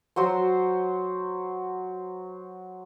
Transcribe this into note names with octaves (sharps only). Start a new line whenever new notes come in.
F#3 F#4 C5